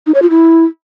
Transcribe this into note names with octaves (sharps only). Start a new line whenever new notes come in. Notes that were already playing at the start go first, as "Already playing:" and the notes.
D#4
C#5
F4
E4